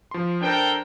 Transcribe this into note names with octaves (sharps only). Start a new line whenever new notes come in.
F3 C6
D4 A4 A#4 C5 G5